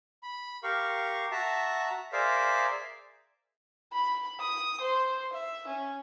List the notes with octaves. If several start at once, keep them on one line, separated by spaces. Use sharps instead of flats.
B5
G4 A#4 F5 C#6
F#4 E5 A5 A#5
G#4 A#4 C5 D5 E5 F5
B5
D#6
C5
E5
C#4